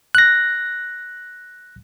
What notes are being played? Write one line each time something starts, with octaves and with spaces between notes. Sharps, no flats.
F#6 A#6